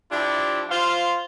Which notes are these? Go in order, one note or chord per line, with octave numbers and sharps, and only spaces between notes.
F3 D4 E4 G4
F4 C5 F5